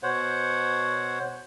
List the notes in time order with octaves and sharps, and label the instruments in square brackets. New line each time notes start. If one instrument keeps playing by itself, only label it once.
[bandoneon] B2 C5 C#5 F#5